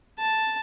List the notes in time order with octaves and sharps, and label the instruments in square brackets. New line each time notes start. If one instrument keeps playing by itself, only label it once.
[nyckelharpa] A5